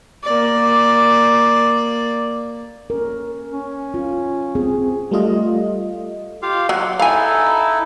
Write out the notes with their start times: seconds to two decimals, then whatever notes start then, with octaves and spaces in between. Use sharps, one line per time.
0.23 A#3 D5
2.90 C#4 A#4
3.51 C#4
3.94 F4
4.55 C4 G#4
5.11 G3 A3 F4 D#5
6.42 F4 G4 F5
6.69 F#3 F#5
6.99 D#4 E4 A4 F5 G#5